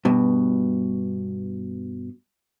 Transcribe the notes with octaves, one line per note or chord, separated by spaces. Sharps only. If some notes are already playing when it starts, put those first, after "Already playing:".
G2 B2